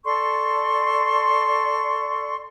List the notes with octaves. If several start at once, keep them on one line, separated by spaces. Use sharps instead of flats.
A4 D5 C6 C#6